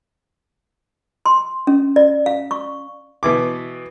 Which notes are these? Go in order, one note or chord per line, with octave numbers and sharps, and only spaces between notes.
C6
C#4
D5
F5
C#6
B2 E3 D6